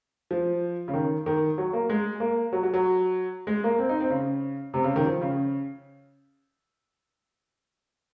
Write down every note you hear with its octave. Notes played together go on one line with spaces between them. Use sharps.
F3
C#3
D#3
D#3
F#3
A#3
G#3
A#3
F#3
F#3
F#3
G#3
A#3
C4
D#4
C4
C#3
C3
C#3
D#3
F3
C#3